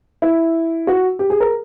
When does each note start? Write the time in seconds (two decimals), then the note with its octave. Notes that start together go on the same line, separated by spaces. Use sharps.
0.22 E4
0.87 F#4
1.19 G4
1.30 G#4
1.40 A#4